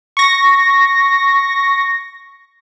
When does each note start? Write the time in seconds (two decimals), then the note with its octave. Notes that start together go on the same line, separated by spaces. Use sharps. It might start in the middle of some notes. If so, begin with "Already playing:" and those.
0.17 C#6 A#6